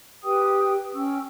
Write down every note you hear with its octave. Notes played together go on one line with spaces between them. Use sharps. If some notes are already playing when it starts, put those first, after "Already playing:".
G4 B4 G5 D#6
C#4 G5 C#6 E6